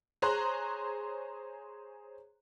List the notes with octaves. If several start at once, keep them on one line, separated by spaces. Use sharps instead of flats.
G#4 C5 C#5 A#5 C6 F#6